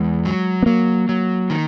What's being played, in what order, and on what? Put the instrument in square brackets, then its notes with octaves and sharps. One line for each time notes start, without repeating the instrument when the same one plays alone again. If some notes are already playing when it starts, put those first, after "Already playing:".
Already playing: [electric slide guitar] E2 [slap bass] G#3
[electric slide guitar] F#3
[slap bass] B3
[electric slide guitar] F#3 [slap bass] A#3
[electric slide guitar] F#3
D#3